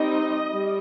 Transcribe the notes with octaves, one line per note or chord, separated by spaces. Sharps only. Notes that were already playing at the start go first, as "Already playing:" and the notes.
Already playing: G3 C4 D#4 D#5
G3